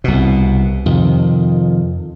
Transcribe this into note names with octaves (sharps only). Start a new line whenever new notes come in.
C2 B2
F2 C3 D#3